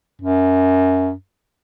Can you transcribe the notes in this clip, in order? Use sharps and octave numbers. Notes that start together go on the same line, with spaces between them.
F#2